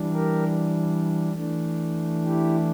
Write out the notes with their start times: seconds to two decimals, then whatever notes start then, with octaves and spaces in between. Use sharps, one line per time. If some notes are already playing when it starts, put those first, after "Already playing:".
Already playing: E3 G3 D4
0.12 G4 A#4
1.33 E3 A3 D4
2.25 E4 G4